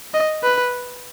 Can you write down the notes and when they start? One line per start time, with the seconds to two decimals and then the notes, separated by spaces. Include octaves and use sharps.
0.14 D#5
0.43 B4